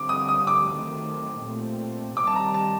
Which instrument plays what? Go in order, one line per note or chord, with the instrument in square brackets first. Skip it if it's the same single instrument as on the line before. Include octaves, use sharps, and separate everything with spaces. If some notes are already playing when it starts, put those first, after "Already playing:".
Already playing: [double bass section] D3 G3 C4 [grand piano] D6
[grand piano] D#6
D#6
D6
[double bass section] D#3 F#3 A3 C4
A#2 A3 C4
[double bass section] C3 D#3 G3 C4 [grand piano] D6
[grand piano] A5
A#5
A5